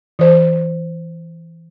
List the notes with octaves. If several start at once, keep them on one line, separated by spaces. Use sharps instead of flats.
E3 C5